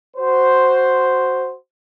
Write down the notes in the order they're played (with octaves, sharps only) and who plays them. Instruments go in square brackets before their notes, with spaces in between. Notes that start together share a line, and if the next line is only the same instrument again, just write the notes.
[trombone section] F#4 C5